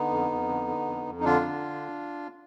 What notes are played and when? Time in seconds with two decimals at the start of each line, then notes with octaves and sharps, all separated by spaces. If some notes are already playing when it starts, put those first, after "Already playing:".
Already playing: D3 B3 D#4
0.11 F2
0.30 F2
0.49 D3
0.68 D3
0.87 F2
1.06 F2
1.20 D#4
1.25 D3 D4 F4
1.45 D3